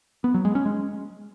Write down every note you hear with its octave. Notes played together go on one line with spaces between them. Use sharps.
B3
F#3
G#3
C#4
G#3